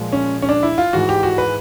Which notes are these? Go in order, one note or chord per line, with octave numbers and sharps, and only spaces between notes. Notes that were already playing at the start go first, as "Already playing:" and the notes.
Already playing: A#2 F3 G#3
C#4
C#4
D4
E4
F4
G#2 E3 G#3 F#4
G4
F#4
B4